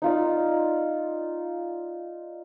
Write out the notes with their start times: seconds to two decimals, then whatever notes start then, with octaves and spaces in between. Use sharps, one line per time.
0.02 D#4 F4 D5